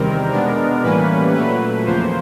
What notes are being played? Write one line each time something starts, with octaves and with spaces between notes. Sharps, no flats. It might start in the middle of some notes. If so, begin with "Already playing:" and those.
Already playing: E2 C3 D#3 G3 C4 A#4
B2 G#3 B3 D4
A2 E3 G3 A#3 C#4 B4
A#2 F#3 A3 B4
E2 C#3 F3 A#3 C5